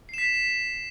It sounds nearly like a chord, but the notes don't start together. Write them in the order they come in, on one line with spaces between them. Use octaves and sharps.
C7 E7 B6